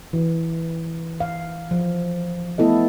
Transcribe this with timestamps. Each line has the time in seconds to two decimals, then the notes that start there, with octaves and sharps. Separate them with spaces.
0.13 E3
1.20 F5
1.71 F3
2.58 A3 B3 E4 A4 D#5